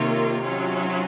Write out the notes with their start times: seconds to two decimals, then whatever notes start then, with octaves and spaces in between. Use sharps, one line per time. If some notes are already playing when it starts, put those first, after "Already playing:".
Already playing: C3 D#3 A#3 F4 A#4 C#5
0.43 F#3 C#4 F4